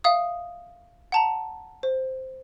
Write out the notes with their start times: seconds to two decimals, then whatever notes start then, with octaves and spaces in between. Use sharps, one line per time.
0.04 E5 F5 D#6
1.12 F#5 A5 A#5
1.83 C5